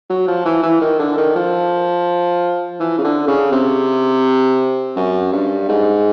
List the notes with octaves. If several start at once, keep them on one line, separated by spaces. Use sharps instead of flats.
F#3
F3
E3
E3
D#3
D3
D#3
F3
E3
C#3
D3
C#3
C3
F#2
G2
G#2